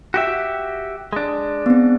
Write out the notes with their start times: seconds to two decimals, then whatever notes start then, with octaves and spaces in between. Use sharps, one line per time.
0.14 F#4 G4 E5
1.13 G#3 D4
1.66 B3 C4